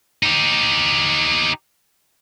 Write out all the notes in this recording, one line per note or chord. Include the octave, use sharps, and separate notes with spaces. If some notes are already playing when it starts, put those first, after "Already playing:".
D#4 G4